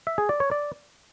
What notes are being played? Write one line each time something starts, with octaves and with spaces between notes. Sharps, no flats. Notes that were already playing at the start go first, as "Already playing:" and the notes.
E5
G#4
D5
C#5
D5